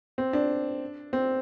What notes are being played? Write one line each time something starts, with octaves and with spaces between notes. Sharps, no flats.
C4
D4
C4